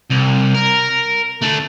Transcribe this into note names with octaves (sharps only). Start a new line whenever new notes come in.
C2
A#4
A3 D4